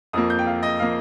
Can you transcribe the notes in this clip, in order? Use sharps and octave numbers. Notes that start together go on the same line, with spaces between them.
F2 F3 A#3 D#6
G6
G5
F5
D#5
F3 A#3 F5